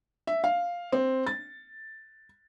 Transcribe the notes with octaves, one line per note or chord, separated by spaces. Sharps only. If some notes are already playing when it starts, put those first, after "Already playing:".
E5
F5
C4
A6